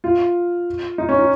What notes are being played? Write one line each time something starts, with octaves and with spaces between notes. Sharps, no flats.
F4
D#4
C#4
D#4